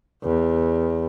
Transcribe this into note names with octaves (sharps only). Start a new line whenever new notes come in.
E2